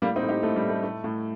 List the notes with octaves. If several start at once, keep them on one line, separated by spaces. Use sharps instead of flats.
A2 G3 A#3
C4 D#4
A2
D#4 G4
A2 A3
G3
A2
A3
A2 A3
A2